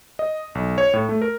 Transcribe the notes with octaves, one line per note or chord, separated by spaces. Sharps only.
D#5
B1
C#5
A2
A3
A#4